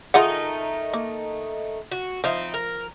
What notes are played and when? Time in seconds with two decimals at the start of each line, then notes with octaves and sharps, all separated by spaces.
0.14 D#3 A3 D#4 F4 G#4 F#5
0.94 A#3
1.91 F#4
2.24 F3 C4 D#4 E4
2.54 A#4